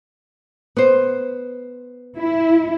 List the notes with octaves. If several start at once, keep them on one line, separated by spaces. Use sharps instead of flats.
B3 C5
E4